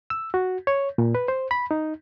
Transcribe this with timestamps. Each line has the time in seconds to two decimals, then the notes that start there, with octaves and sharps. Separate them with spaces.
0.10 E6
0.34 F#4
0.67 C#5
0.98 A#2
1.15 B4
1.28 C5
1.51 B5
1.71 D#4